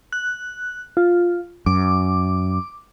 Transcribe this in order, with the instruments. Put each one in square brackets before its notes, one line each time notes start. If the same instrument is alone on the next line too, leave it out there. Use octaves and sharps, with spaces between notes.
[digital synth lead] F#6
F4
[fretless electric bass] F#2 [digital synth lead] D6